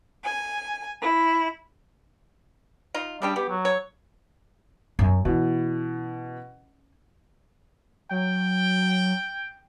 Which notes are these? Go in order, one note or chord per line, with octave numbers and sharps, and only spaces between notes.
G#5
E4
D#4 F4
C#3 G3 D4 G4
B3 G4
F#3
C#5
F#2
B2 E3 C#4
F#3 G5